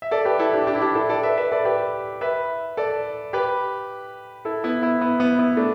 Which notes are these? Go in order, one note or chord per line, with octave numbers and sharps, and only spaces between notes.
E5
A4 D5
G4 B4
E4 A4
D4 G4
D4 G4
E4
D4 G4
E4 A4
A4 D5
B4 E5
B4 E5
A4 D5
G4 B4
B4 E5
A4 D5
G4 B4
E4 A4
B3 E4
B3 E4
B3
B3
B3 E4
A3 D4